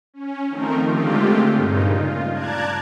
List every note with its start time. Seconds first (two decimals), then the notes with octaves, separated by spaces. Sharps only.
0.14 C#4
0.48 D#3 F3 A3 C4 D#4 A#4
0.86 D3 G#3 A3 C4 F4 G4
1.52 G2 A#2 C#3 D#4
1.90 F4
2.33 D5 A5 A#5 F#6 G#6